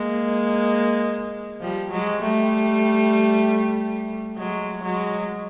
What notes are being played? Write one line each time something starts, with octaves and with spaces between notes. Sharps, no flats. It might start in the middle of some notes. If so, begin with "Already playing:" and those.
Already playing: G#3 A#3
F3 G3
F#3 G#3
G3 A3
F#3 G#3
F#3 G#3